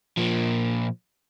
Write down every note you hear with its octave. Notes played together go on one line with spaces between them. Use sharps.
A#2 F3